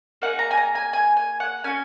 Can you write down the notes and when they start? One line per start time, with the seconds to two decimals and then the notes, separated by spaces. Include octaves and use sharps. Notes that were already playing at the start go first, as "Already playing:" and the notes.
0.22 A#3 D#4 G#4 F#5
0.39 A#5
0.51 G#5
0.57 A#5
0.75 G#5
0.93 G#5
1.17 G#5
1.40 F#5
1.64 C#4 F#4 G#5